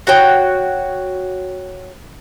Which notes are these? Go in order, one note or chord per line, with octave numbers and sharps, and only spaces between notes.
F#4 C#5 G5